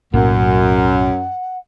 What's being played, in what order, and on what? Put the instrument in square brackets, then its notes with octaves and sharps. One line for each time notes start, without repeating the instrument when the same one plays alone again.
[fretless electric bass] B1 A2 A#3 [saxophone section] F#2 [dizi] F#5